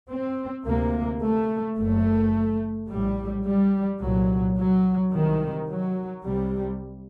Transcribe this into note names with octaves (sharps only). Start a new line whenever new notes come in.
C4
D2 C3 A#3
A3
F#1 F#2 A3
A#1 A2 G3
G3
C2 A#2 F#3
F#3
C2 C3 D#3
F#3
C2 C3 G3